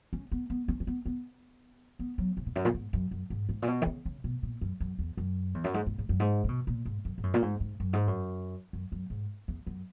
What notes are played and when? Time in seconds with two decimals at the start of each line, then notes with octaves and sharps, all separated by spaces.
0.13 C#4
0.32 B3
0.50 B3
0.68 C#4
0.80 C#4
0.87 B3
1.06 B3
1.99 B3
2.18 F#3
2.37 C#3
2.46 B2
2.51 E2
2.56 F#2
2.65 A#2
2.74 G#2
2.93 F#2
3.11 F#2
3.30 G#2
3.49 G#2
3.62 A#2
3.68 B2
3.82 D#3
3.86 C#3
4.05 C#3
4.24 B2
4.43 A#2
4.61 F#2
4.80 F#2
4.99 E2
5.17 F#2
5.54 E2
5.64 F#2
5.74 G#2
5.87 G#2
5.98 G#2
6.09 F#2
6.20 G#2
6.44 C#3
6.49 B2
6.67 A#2
6.85 G#2
7.05 F#2
7.18 G#2
7.23 F#2
7.34 A#2
7.42 G#2
7.60 G#2
7.80 F#2
7.93 G#2
8.08 F#2
8.73 F#2
8.92 F#2
9.10 G#2
9.48 E2
9.67 F#2